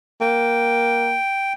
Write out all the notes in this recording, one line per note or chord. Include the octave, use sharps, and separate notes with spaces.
A#3 G5